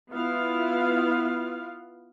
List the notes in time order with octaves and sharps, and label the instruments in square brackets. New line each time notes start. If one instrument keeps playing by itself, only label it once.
[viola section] B3 E4 F4 F5